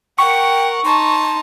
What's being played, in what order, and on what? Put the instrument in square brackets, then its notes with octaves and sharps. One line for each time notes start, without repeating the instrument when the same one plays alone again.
[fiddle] A#4 F#5 [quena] G5 [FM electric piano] C#6
[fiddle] D#4 A5 [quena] C6